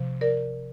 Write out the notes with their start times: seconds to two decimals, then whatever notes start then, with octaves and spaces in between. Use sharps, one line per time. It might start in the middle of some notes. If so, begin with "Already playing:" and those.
Already playing: C3 F3
0.21 A#4 D5